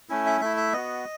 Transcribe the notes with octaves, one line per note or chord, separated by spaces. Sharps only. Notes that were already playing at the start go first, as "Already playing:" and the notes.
A3 C#4 E4
E5
A3 E4 E5
E5
B3 F#4 D#5